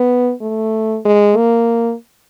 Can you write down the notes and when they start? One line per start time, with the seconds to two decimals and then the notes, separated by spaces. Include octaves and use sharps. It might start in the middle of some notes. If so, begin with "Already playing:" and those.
Already playing: B3
0.41 A3
1.05 G#3
1.37 A#3